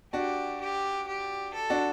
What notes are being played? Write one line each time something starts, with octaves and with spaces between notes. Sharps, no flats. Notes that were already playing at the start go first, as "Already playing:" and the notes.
D4 F#4 G4
G4
G4
A4
D4 F#4